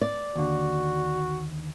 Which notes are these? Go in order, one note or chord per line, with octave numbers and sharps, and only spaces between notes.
D5
D#2 D3 F#4